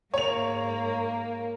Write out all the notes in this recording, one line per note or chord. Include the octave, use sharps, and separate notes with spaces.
G#2 A#3 C#5 F7